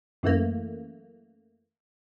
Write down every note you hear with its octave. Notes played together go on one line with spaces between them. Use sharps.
F#2 E3 A3 A#3